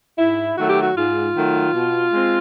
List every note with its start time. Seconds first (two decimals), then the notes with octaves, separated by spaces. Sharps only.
0.19 G#2 E4
0.57 D#3 F#3 A3 F#4
0.68 G4
0.80 F#4
0.95 G#2 F4
1.35 D#3 F#3 A3
1.72 B2
2.10 G#3
2.16 C4